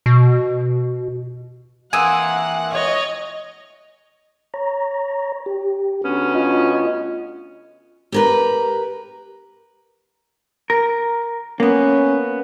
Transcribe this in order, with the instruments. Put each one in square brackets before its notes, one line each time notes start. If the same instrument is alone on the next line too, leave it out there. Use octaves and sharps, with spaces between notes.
[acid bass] B2
[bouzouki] E3 A#3 C4 [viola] F#5 [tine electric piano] G#5 D#6 E6
[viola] C#5 D#5
[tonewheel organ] C#5 A#5
G4
[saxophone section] D2 B3 C#4
[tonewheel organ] F4 D#5
[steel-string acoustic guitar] G4 A#4 B4
[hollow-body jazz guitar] A#4
[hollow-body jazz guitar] A#3 B3 [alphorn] C#4